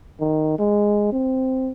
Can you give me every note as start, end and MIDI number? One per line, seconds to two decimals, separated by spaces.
0.20 0.57 51
0.59 1.11 56
1.12 1.72 60